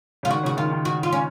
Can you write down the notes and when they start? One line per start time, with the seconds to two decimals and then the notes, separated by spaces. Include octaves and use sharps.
0.23 C#3 F4
0.30 D#3 F#4
0.43 C#3 F#4
0.57 D#3 F4
0.71 D#3
0.85 F#4
1.03 F4
1.12 C#4